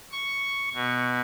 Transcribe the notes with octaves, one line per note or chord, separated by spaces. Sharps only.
C#6
B2